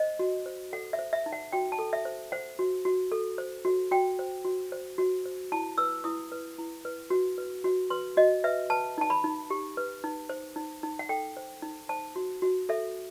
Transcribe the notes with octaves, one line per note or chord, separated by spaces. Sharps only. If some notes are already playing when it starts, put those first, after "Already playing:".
Already playing: C5 D#5
F#4
C5
A4 F#5
E5
C5
E5
D#4
F#5
F#4 G5
A5
A4
E5
C5
C5 F#5
F#4
F#4
A4
C5
F#4
F#4 G5
C5
F#4
C5
F#4
C5
E4 A5
B4 E6
E4 D#6
B4
E4
B4
F#4
B4
F#4
B4 C6
F#4 D#5
B4 E5
B4 A5
D#4 A5
B5
D#4
G4
B4
D#4
C5
D#4
D#4
F#5
A4 G5
C5
D#4
C5 A5
F#4
F#4
A4 E5